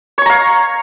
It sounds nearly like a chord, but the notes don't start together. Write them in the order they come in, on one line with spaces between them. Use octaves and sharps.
C#5 C#6 A#5 F5